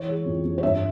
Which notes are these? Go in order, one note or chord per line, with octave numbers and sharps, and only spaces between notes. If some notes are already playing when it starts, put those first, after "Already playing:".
Already playing: E3 C#5
G#3
F2
F2
C#5
G2 E5